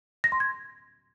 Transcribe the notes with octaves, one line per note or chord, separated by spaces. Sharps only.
A#6
C6
G#6